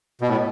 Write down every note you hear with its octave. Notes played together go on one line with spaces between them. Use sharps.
B2
A2